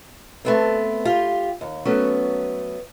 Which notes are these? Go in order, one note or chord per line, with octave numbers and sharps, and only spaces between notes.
A3 B3 C4
F4 G4
D#2
F#3 A3 B3 C#4